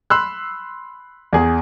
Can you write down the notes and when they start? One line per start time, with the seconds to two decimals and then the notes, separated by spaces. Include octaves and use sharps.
0.10 B5 C6 E6 F#6
1.33 E2 G#4